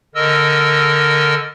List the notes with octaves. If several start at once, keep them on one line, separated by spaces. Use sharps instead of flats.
D3 A#4 D#5 E6